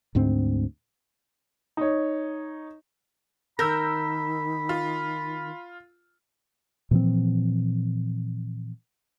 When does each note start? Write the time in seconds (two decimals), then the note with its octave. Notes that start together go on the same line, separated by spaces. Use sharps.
0.15 D2 G#2 D3 C4
1.77 D#4 C#5
3.59 D#3 A#4 B5 E6 G6 A#6
4.69 F4
6.91 A#2 E3 F3 C4